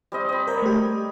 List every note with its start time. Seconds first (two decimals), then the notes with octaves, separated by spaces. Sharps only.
0.12 G3 C4 D#5
0.29 D#5 B5
0.47 A#4 C5 C#5 G5 A#5
0.62 A3 G4